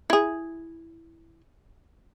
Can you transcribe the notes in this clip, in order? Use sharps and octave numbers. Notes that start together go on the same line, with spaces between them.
E4 G#4